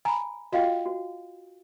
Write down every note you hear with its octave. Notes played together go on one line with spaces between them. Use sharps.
G#5 A#5 B5
F4 F#4 D#5 F5 G5
F#4